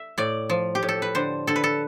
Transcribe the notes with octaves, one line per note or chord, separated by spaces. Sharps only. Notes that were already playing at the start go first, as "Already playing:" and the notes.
Already playing: E5
A2 D5
F3
G4
A2
A4
B4
D3 C5
D3 A4
B4
A4